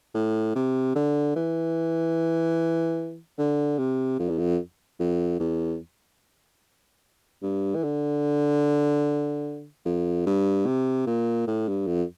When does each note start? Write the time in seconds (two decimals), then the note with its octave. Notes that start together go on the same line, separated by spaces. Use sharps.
0.14 A2
0.55 C3
0.95 D3
1.36 E3
3.39 D3
3.78 C3
4.19 F2
4.29 E2
4.39 F2
5.00 F2
5.40 E2
7.42 G2
7.75 E3
7.84 D3
9.85 F2
10.26 G2
10.66 C3
11.07 A#2
11.47 A2
11.68 G2
11.87 F2